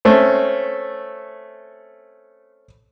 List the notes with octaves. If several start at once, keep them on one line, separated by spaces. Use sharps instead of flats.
A3 C4 C#4